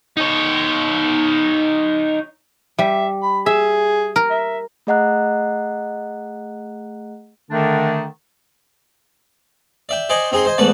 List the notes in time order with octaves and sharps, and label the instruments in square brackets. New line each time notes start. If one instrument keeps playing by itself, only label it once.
[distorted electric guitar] D#4 C#5
[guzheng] G3 [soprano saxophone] E5
[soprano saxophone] B5
[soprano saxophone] G#4 [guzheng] E5
[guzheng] A#4
[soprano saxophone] E5
[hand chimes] A3 G#4 D#5 F#5 A#5 F#6
[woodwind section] D3 D#3 A3 D4
[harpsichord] D5 E5 G5
C5 D5 D#5 G5 G#5 C#6
C4 D#4 G#4 G#5 C6
C5 D#5 G#5
E2 G#2 A3 B4 D5 A5